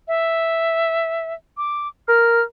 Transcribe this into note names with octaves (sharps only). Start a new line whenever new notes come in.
E5
D6
A#4 F6